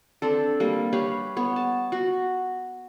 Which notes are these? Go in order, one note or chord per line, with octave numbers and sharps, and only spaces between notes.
C4 D4 A4
G3 A#3
G4 B4 C#5 F5
B3 C#5
A5
F#4